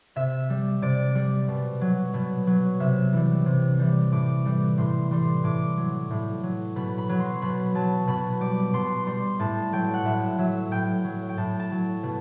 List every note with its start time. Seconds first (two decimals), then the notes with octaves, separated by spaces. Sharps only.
0.16 C3 E5
0.50 G3
0.82 C3 D5
1.15 G3
1.48 B2
1.81 F#3
2.14 B2
2.47 F#3
2.80 C3 E5
3.13 E3 G3
3.46 C3
3.79 E3 G3
4.12 A2 D6
4.45 E3 G3
4.78 A2 C6
5.11 E3 G3 C6
5.44 A2 D6
5.77 F#3
6.10 A2
6.43 F#3
6.76 B2 B5
6.98 B5
7.09 F#3
7.20 C6
7.41 B2 B5
7.75 F#3 A5
8.07 B2 B5
8.40 G3 D6
8.74 B2 C6
9.07 G3 C6
9.40 A2 A5
9.72 F#3 G5
9.94 F#5
10.05 A2 E5
10.38 F#3 E5
10.71 A2 G5
11.05 F#3
11.29 G5
11.37 A2 A5
11.60 A5
11.71 F#3
12.03 B2